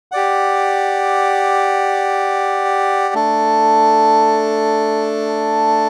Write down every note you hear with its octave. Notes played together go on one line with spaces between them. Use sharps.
G4 D5 F#5
A3 D4 A4